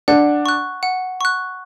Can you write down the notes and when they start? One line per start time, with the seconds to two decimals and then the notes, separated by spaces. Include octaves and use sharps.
0.08 D4 F#5
0.46 C#6 F#6
0.83 F#5
1.21 C#6 F#6